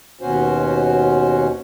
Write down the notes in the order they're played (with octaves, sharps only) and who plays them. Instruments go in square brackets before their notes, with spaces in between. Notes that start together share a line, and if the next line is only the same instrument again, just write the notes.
[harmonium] D#2 B2 C#4 F#4 C5